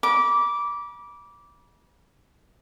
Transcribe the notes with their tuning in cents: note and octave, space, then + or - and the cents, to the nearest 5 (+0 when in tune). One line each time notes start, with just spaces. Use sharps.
B5 -40 D6 -15